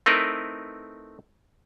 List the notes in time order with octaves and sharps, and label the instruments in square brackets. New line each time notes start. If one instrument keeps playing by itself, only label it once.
[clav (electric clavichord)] A3 C4 D#4 E4 A#4 B4